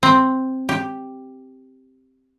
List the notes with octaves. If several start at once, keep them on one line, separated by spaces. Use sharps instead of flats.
C4
G4